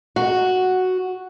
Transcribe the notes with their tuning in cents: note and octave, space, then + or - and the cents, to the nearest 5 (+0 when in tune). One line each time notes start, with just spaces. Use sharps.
F#4 +0